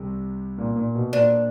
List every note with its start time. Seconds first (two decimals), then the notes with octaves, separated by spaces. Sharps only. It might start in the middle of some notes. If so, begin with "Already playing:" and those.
Already playing: C2 C3
0.58 A#2
0.76 A#2
0.95 B2
1.13 A#2 D4